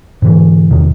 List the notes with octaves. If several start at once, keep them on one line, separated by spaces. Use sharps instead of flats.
G#2 D3 E3
E2 A2 C3 D#3